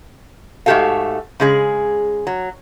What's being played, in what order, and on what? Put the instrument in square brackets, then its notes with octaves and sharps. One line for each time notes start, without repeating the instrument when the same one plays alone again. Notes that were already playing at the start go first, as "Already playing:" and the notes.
[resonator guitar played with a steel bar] G#2 A3 F#4 G4 A4 F5
C#3 G#3 G#4
F#3